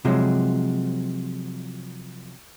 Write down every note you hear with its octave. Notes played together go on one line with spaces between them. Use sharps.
C3 F3 F#3 G#3